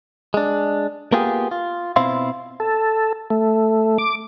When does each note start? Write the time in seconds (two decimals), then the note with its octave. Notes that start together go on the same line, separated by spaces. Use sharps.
0.34 G#3 D4
1.12 A#3 B3 F4 G4 G#4
1.51 F4
1.96 B2 C4 E4 F5 C6
2.60 A4
3.30 A3
3.98 D6